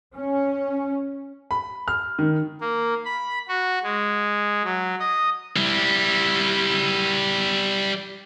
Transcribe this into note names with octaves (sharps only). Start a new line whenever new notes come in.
C#4
B5
F6
D#3
A#3
B5
F#4
G#3
F#3
D#5
G3 E4